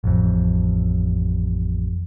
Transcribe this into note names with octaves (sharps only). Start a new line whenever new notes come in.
A1 F2